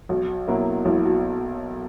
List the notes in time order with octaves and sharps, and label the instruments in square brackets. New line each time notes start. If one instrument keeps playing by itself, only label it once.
[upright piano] B1 [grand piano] F#4
[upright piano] B2 F#3 A#3 E4
[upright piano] B1 [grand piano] E4
[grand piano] F#4